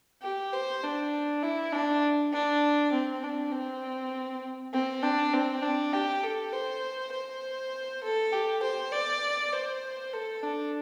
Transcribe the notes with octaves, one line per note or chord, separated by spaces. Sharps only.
G4
C5
D4
E4
D4
D4
C4
D4
C4
C4
D4
C4
D4
G4
A4
C5
C5
A4
G4
C5
D5
C5
A4
D4